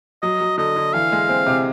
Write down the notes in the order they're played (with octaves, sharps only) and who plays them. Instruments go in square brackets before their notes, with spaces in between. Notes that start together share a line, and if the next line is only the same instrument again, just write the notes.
[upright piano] F#3 [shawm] D#5
[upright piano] F#3
[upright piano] D3 [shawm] D#5
[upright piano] D3
[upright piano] E3 [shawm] F5
[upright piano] G#3
C4
C3